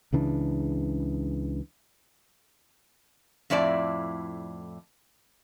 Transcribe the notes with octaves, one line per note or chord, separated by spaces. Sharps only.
C#2 C#3 E3 D4
F2 A2 E4 D5 A5